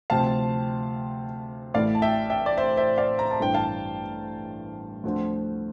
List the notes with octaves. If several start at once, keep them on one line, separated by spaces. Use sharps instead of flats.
D2 C3 F3 C4 F4 F5 A5
A1 A2 E3 A3 E4 D5 F5
A5
E5 G5
E5 G5
D5
C5 E5
C5 E5
D5 F5
A#5
A5
A1 G2 E3 A3 D4 G5
F5 A5
D2 D3 F3 C4